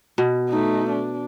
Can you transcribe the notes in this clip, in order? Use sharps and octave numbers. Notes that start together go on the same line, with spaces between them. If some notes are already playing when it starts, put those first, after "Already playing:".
B2
A3 D#4
D4